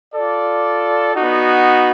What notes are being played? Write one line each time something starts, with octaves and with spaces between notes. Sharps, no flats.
F4 A4 D5
B3 D#4 F#4